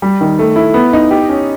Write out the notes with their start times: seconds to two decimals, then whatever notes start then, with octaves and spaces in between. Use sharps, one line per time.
0.02 G3
0.21 D#3
0.39 A3
0.56 E4
0.74 B3
0.93 D#4
1.11 G4
1.29 C#4